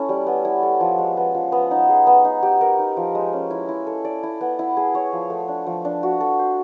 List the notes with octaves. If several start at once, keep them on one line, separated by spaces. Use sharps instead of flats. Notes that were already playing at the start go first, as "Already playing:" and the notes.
Already playing: C#4 E4 A4
G3
B3
E4
A4
F3
G#3
B3
F3
B3
D#4
G#4
B3
D#4
G4
A#4
D#4
F3
G#3
C#4
E4
E4
A4
D5
E4
B3
E4
G#4
C#5
F3
A3
D4
F3
D4
F#4
A4
C5